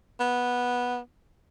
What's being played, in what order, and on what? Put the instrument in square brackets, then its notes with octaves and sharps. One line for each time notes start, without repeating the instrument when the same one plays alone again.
[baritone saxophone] B3